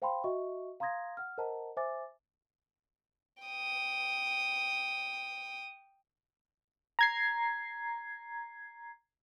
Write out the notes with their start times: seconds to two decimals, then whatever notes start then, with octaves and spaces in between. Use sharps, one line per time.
0.02 C5 F5 G5 A5 B5 C6
0.24 F#4 D#5 E5 C#6
0.80 F5 A#5 C6 D#6 G#6 A#6
1.17 F#5 F6
1.38 A#4 C5 D#5 F#5 A5 A#5
1.77 C5 E5 G#5 D6 A6
3.43 G5 D#6
6.99 A#5 G#6 C7